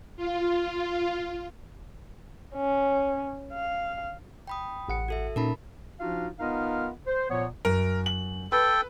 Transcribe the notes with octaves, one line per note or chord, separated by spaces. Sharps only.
F4
C#4
F5
G5 B5 D#6
A1 F#5 C#7
F#4 A4 E5
A#2 C#4 D#4 A#4 A5 B5
F3 D4 D#4 F4 F#4 F5
B3 D#4 F4 A#4 D#5 F5
C5
A#2 F3 B3 C#5
F#2 A#4
F#7
A4 B4 G5